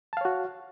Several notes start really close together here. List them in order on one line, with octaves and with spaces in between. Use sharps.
A5 F5 C#5 F#4